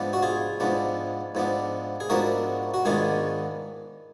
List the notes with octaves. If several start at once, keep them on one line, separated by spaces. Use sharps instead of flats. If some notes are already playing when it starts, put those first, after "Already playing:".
Already playing: G#2 F3 B3 D4
F#4
F4 G#4
G#2 F3 B3 D4
G#2 F3 B3 D4
G#4
G#2 F3 B3 D4 F#4 A#4
F#4
G#2 D#3 G#3 B3 D4 F4 G#4